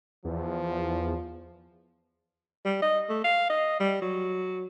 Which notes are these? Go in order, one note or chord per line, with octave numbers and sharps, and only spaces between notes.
E2 F3
G3
D#5
A3
F5
D#5
G3
F#3